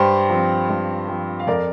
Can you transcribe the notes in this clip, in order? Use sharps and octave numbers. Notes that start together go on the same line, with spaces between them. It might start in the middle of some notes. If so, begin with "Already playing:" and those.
Already playing: G2 G4 C5
F3 C4
G2
F3 C4
F5
F2 A#4 D5